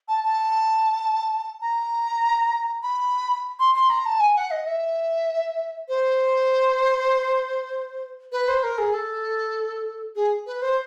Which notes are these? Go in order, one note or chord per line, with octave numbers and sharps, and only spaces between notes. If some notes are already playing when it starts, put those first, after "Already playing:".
A5
A5
A#5
B5
C6
C6
A#5
A5
G#5
F#5
D#5
E5
C5
B4
C5
A#4
G#4
A4
G#4
B4
C5